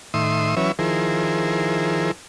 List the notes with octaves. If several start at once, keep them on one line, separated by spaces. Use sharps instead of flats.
A2 D#3 E5 C6 D#6
E3 F#3 C#4 B4 C#5 E5
D#3 F3 E4 G#4 A#4 C5